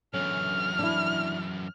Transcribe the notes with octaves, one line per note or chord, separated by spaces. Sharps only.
F#2 D3 E3 C#4 F6
D4 E4